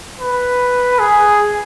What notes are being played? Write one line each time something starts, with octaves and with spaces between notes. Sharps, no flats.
B4
G#4